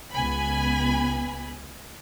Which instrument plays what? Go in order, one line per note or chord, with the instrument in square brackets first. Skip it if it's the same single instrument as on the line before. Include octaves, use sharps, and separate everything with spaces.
[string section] C#2 B3 G#5 B5